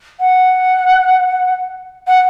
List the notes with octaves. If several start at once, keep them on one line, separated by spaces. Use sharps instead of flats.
F#5
F#5